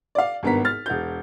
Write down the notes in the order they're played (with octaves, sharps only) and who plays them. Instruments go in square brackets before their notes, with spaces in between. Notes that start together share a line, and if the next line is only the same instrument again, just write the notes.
[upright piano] D5 F5
G#1 G2 B3 A#4 A#5 B6
F6 A6
E1 G6